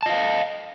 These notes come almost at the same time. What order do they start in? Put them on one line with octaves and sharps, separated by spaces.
A5 D#5 F5